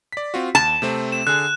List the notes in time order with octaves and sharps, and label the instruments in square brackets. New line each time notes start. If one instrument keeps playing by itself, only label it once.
[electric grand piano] D5 B6
C4 F4 F#4
[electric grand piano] D#2 [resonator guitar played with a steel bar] A5
[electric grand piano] C3 A3 C4
[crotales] E7
[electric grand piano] D3 G#4 [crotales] F#6